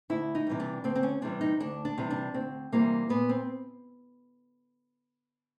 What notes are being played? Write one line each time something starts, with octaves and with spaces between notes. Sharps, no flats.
D2 E4
D#4
C3 E3 G3
D4
D2 C4
C4
C#4
C3 E3 G3 D4
D#4
D2 D4
D4
C3 E3 G3
D4
D2 C4
C3 E3 G3 A#3
A#2 B3
C4